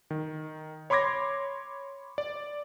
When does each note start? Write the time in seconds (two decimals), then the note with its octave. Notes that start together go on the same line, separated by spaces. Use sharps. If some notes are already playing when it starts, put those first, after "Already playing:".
0.11 D#3
0.90 C#5 B5 C6 D6 G#6 A#6
2.18 D5